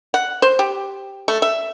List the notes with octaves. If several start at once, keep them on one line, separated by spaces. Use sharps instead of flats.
F#5
C5
G4
A3
E5